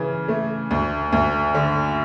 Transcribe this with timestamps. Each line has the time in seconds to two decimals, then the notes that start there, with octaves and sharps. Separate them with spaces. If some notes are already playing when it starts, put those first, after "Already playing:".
Already playing: C#3 E3
0.28 A3
0.71 D2
1.13 D2
1.55 D3